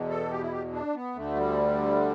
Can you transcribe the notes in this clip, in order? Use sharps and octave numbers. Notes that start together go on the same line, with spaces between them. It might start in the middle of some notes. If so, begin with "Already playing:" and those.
Already playing: E2 B2
A4
G4
E4
G4
D4
B3
D2 D3 A3
G3